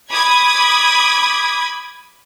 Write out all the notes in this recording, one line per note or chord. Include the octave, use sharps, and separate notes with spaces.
B5 D6 D#6 G#6